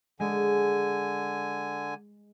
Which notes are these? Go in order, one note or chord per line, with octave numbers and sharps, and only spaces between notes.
D3 G#3 G#5